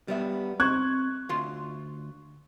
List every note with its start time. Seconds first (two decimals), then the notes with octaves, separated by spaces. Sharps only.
0.08 G3 B3 E5
0.60 C4 C#6 F#6 G#6
1.29 D2 F4 C6